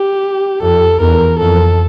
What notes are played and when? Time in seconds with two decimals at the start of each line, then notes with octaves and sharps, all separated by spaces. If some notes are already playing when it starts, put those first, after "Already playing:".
Already playing: G4
0.62 F2 A4
1.00 E2 A#4
1.39 F2 A4